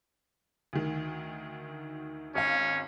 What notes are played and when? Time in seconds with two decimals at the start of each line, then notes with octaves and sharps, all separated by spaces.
0.73 D2 D#3
2.35 G#1 C#4 F5